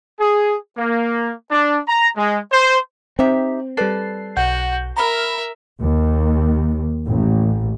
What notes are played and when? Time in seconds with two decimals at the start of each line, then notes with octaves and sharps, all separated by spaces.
0.19 G#4
0.77 A#3
1.51 D4
1.88 A#5
2.17 G#3
2.52 C5
3.19 C4 D#4 G4 E5
3.77 G3 A4 B4 D5 C7
4.37 B1 F#4 F#5 G6
4.97 A#4 E5 A#5 B5 F6
5.81 D#2
7.05 A1